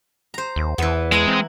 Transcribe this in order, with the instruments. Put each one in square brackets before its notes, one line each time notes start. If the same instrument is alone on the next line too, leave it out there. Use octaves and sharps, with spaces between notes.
[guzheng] C5 A#5
[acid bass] D#2
[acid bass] E2 [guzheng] E3 B3
[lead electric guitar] G#3 [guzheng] E4 A#5
[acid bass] C4